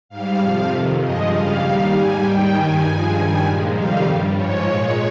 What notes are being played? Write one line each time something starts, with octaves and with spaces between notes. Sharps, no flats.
G#2 G3 F5
F2 C3 F3
F2 C3 D#3
G2 F3 G#3 D#5
F2 C#3 G3 F5
D#2 D#3 G3
G#2 G3 G#5
D#2 D#3 G3 G5
G2 D#3 G3 G#5
G2 F3 G#3
G2 D#3 G3
A#2 F3 G#3
F2 C3 D#3 G3 F5
G2 G3
G#2 F3 G#3 C#5
A#2 G#3 C#5